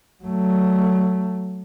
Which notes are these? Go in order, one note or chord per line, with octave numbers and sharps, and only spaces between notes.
F#3 A3